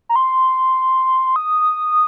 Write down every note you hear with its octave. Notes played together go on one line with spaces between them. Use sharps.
A#5
C6
D#6